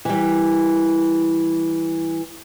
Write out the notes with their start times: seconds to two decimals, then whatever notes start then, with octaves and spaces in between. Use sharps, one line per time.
0.05 E3 G3